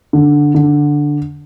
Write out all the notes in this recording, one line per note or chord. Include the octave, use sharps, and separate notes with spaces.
D3
D3